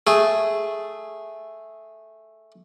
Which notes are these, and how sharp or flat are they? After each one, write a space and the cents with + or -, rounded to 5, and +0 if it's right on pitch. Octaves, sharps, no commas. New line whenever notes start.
A3 -5 G#4 +0